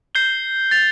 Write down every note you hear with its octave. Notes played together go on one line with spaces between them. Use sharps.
G6 C7 G7
A6 F7